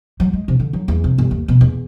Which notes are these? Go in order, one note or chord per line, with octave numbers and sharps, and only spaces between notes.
F#3
G#3
C3
D3
F#3
E2
C3
G1
D#2
B2
E2